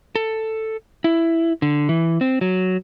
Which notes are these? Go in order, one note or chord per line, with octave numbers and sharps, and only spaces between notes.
A4
E4
D3
E3
C4
F#3